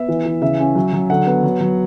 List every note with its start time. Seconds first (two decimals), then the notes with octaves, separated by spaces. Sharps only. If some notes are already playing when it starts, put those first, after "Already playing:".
Already playing: B3 E5
0.08 E3
0.25 E3
0.41 C#3 E5
0.59 C#4
0.75 F#3
0.93 F#3
1.10 D3 F#5
1.27 B3
1.44 F#3
1.60 F#3